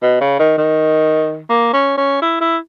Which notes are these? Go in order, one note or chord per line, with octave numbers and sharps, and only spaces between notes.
B2
C#3
D#3
D#3
A#3
C#4
C#4
E4
E4